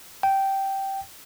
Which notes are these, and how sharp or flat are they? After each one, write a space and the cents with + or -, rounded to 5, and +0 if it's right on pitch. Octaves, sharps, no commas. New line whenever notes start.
G5 -10